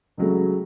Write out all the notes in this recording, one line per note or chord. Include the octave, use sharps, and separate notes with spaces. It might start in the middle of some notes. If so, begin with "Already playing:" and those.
C#2 C#3 F#3 A3